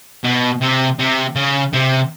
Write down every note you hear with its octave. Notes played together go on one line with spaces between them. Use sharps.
B2
C3
C3
C#3
C3